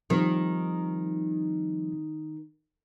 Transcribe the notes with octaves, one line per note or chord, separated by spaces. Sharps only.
D#3 F3 G3 C4